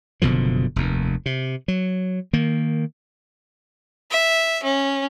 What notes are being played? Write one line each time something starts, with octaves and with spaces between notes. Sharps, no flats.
F#1 B2 D3 F3
F1 D#2
C3
F#3
D#3 A#3
E5
C#4